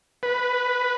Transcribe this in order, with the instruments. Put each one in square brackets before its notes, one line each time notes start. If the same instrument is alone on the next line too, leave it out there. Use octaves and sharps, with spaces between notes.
[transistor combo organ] B4